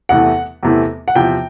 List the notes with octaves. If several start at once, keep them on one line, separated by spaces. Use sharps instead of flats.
E2 C3 E3 A3 F#5
E2 C3 E3 A3
F#5
E2 C3 F3 G5